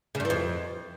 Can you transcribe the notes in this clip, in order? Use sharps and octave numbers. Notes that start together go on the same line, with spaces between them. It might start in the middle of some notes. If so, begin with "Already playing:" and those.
C#3
G2
E3
F2